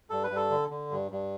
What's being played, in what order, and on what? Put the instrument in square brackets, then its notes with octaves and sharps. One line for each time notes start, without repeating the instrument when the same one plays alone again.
[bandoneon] G2 A4
B4
G2
A4
D3
D3
G2
G2